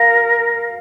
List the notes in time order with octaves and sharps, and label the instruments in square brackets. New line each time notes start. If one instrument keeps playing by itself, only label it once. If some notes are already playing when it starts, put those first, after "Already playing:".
Already playing: [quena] A#4 [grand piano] F5